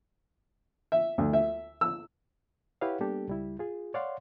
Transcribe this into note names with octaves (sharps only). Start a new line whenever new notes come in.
E5
D2
E5
E6
E4 G4 B4 C#5 F5 F#5
G3 A#3 B3 D4 G4 A4
C#2 G3 E4
F4 G#4
C#5 D5 F5 F#5 C6